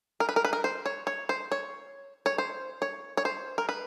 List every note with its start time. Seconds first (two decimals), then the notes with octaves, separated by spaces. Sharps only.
0.20 A#4
0.29 B4
0.36 A#4
0.45 B4
0.53 A#4
0.64 C5
0.86 C#5
1.07 C#5
1.29 C5
1.52 C#5
2.26 C#5
2.38 C5
2.82 C#5
3.17 C#5
3.25 C5
3.58 A#4
3.69 B4